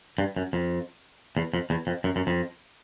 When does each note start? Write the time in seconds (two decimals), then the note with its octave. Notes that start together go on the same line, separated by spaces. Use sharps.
0.18 G2
0.36 F#2
0.53 F2
1.37 E2
1.54 F2
1.70 E2
1.87 F2
2.04 F#2
2.16 F#2
2.27 F2